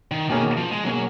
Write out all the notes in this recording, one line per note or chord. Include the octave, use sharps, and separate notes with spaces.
D#3
B2 D#3 A#3 C#4 G#4
F3
G#3
B2 F#3 A#3 C#4 G#4